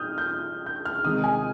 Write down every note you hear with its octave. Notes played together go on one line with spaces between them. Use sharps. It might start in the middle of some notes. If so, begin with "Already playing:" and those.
Already playing: D#6 F6 G6
G6
G6
F6
C3 D#3 G#3 D#4 D#6
G#5